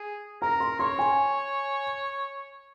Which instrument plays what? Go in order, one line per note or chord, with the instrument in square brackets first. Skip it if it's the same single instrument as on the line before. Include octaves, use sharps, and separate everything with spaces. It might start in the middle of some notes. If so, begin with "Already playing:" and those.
Already playing: [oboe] G#4
[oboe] A#4 [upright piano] A#5
[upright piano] C6
[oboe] C#5 [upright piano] C6
[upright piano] G#5